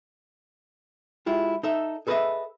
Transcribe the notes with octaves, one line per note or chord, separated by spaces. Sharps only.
G#3 E4 F4 G4
D#4 A4 E5
G#4 A4 B4 C5 D#5 E5